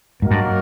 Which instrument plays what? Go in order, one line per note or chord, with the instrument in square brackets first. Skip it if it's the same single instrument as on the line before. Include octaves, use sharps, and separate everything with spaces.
[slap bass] G#2 [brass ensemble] F#3 A#3 D#4 F#4 A#4
[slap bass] G2